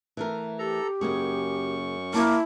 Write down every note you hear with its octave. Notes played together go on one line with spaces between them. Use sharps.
E3 A3 A#4
G4 A4 A#5
F#2 C#3 A#3 G#4 C#6
A#3 E4 A5